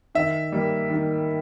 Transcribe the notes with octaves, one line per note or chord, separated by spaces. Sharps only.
D#3 E5
G3 A#3
D#3